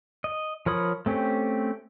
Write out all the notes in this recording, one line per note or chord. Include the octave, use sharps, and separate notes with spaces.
D#5
F3 A#4 C#5 B5 D#6
A3 C4 C#4 G4